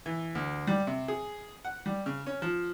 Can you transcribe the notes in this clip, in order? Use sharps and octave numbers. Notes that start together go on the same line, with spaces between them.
E3
D2
G3
C3
G#4
F#5
G3
C#3
C#4
F3